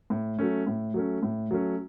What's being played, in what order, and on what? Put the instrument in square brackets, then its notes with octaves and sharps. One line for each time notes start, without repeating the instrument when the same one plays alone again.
[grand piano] A2
F#3 A3 C#4
A2
F#3 A3 C#4
A2
F#3 A3 C#4